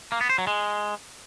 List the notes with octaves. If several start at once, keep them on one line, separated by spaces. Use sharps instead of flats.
A#3
B3
C5
F#3
G#3